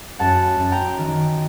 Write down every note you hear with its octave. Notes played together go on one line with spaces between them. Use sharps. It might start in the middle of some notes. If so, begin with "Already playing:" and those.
F#2 F#5 A5
F#2
G5 A#5
D#3